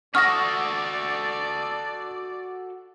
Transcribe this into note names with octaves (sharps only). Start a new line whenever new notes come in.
F#4 A4 D5 F#5 C#6 D#6 F6 A#6